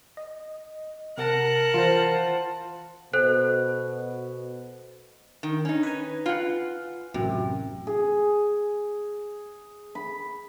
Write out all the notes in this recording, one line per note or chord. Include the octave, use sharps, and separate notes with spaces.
D#5
C3 A#4 F#5 A5
E3 F4 C5
B2 A4 C5 F#6
D#3
C#4 D#4
B4 G#5
F4 F#5
A1 F#2 C3
G#4
B5